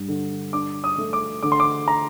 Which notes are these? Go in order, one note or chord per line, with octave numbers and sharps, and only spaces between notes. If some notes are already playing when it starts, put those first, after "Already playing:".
Already playing: G2
D3
D4 D6
D#6
A3
D6
D3 D6
C6
D6
A#5